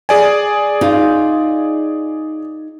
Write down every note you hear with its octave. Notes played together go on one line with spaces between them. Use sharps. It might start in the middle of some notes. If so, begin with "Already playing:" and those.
G#4 D5 G#5
D#4 F4